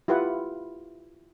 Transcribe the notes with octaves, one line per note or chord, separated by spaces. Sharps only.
E4 F4 G4 B4 F#5